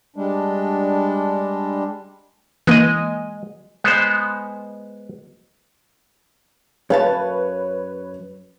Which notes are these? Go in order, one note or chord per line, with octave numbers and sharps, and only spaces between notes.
G3 G#3 D4
E3 G#3 A#3 D#5
G#3 B3 C5
F#2 B4 C#5 F5 A5